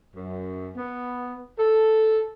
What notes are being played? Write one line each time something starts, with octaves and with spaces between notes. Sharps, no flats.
F#2
B3
A4